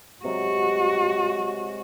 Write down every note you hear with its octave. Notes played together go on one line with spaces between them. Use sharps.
C3 F#3 G#3 F#4